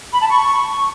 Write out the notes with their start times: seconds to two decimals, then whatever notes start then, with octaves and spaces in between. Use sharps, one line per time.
0.11 B5
0.20 A5
0.29 C#6